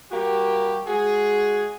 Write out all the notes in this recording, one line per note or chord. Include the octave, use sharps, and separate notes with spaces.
G3 A#3 F#4 G4
G#3 F#4 G#4